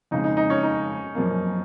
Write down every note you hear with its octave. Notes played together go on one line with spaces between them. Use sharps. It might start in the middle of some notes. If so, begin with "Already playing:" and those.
F2 C#3 G#3 D#4
D#4
D#4
C#4
D#4
F#2 F3 A#3